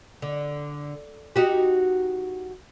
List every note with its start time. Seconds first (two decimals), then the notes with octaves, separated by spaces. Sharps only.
0.22 D3
1.36 D#4 F#4 G4